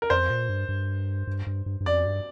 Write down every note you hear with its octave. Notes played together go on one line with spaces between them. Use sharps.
A#4
F2 C5
A#2
G2
G2
G2
G2
G2
G2
F2 D5
G2